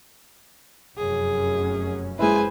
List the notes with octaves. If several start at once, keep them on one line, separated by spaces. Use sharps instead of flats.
F1 F#2 C#4 G#4
G#3 E4 B4 C5 G#5